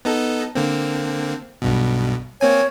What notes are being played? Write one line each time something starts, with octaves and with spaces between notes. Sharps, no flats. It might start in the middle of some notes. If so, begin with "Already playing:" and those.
B3 D#4 A4
D3 A#3 C4
B1 G2 B2
A#3 C4 C#5 G#5